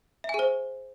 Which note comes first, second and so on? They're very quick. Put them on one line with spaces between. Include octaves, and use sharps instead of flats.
E5 G#5 G#4 C5